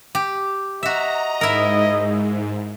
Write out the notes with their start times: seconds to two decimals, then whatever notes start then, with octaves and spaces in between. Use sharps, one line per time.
0.15 G4
0.83 F#4 D#5 E5 A#5
1.41 G#2 E4 A#4